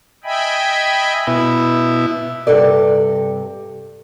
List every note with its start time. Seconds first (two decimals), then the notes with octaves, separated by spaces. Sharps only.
0.24 D#5 E5 G5 G#5 B5
1.27 B2 E4
2.47 G2 C3 A4 D5